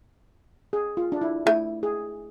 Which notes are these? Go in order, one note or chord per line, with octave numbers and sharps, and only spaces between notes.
G#4
F4
D4
E4
A3 E4
G#4